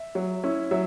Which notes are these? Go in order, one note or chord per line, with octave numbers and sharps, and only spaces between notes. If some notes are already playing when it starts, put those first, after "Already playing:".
Already playing: E5
F#3
C#4 E4
F#3 E5